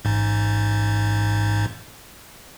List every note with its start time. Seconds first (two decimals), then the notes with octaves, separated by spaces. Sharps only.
0.05 A1 G#2